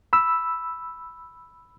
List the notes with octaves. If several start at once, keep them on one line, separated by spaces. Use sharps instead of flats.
B5 E6